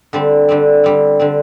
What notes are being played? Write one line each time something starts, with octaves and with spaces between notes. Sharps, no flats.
D3 G3 C4
D3 G3 C4
D3 G3 C4
D3 G3 C4